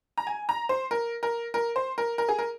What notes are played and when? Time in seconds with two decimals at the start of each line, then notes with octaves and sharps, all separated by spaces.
0.18 A#5
0.27 G#5
0.49 A#5
0.69 C5
0.91 A#4
1.23 A#4
1.54 A#4
1.76 C5
1.98 A#4
2.18 A#4
2.29 G#4
2.39 A#4